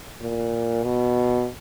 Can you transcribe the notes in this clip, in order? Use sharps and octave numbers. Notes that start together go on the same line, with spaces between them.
A#2
B2